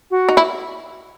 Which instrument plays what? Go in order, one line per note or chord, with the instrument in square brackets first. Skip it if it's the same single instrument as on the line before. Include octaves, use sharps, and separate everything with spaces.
[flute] F#4
[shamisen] D#4
E4